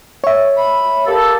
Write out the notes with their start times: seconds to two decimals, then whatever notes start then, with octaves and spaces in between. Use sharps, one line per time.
0.24 C#5 E5
0.58 B5
1.07 A#3 G4 A4